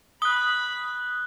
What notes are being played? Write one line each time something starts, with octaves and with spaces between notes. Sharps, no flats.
B5 D#6 F#6 G7